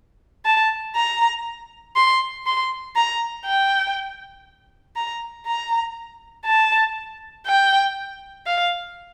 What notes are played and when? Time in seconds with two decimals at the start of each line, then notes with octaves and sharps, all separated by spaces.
0.45 A5
0.96 A#5
1.96 C6
2.46 C6
2.96 A#5
3.46 G5
4.96 A#5
5.46 A#5
6.46 A5
7.47 G5
8.46 F5